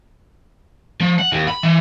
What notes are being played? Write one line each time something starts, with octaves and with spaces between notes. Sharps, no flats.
F3
F#5
D#2
B5
E3